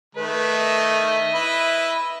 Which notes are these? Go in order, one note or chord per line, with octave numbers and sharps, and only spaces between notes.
D#3 A3 B4
D#5 E5
E4 B4